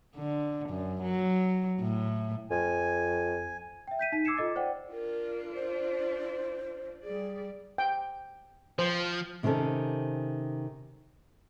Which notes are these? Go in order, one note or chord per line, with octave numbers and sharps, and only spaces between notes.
D3
F#2
F#3
A2
F2 G#5
E5 G5
G6 B6 D#7
D#4 B6
D6 E6 G#6 C7 C#7 E7
F4 A4 D#5 D6 A6
C5 D5 F#5 G5
D4 F4 A#4
C5
G3 G#4 D5
G5
F3 C5
C3 D#3 C4 C#4 A4